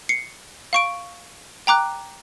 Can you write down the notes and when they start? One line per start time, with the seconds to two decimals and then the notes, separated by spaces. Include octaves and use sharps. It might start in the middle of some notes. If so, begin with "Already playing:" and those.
0.09 C7 C#7
0.73 F5 C#6 D7
1.67 G5 A#5 D6 F#6